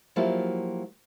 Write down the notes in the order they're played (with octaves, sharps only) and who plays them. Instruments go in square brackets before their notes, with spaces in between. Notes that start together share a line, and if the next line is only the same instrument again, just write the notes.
[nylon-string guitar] F3 F#3 A#3 E4 F4 G4